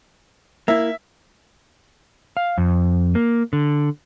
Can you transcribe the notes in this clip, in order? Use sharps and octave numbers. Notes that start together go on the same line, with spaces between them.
A#3 E4 E5
F5
F2
A#3
D3